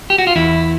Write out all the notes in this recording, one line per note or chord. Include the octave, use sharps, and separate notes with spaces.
G4
F#4
F4
E2 E4